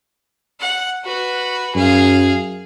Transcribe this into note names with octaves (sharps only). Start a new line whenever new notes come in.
F#5
F#4 B4
F#2 G#4 F5